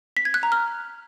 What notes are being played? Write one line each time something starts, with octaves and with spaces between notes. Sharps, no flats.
B6
G#6
F#6
A#5
F6